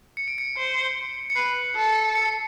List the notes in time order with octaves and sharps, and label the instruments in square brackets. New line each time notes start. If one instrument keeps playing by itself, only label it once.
[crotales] C#7
D7
C#7
[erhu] C5
[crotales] C#7
[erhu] B4 [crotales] C7
[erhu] A4
[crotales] C#7